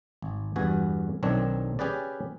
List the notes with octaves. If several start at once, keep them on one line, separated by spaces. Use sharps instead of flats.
G#1
E2 G2 F#4 G#5
B1 D#3 C4 D4 C#5
C#4 G4 G#4 B4 D5